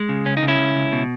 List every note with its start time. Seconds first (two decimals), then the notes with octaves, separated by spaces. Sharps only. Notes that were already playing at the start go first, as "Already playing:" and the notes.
Already playing: G#3
0.09 C#3
0.25 C#2 C#4
0.37 D#4
0.43 C#3
0.48 C#4 E4
0.59 C#2
0.75 C#2
0.92 B2